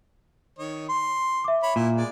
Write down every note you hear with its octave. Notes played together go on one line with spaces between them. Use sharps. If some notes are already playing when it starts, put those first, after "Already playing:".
D#3 C#5 D#5
C6
E5 D6
C#5 B5
A#2 A#3 E4
G#3 D5